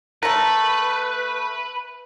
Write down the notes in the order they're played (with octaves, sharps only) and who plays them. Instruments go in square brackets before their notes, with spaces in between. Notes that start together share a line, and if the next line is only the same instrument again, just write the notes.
[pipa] A3 A#4 [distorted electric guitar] B4